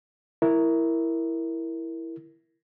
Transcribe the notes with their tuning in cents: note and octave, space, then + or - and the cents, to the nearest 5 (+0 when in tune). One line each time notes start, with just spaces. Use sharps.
E4 +0 A#4 +0